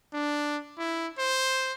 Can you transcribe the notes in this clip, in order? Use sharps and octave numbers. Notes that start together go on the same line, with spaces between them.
D4
E4
C5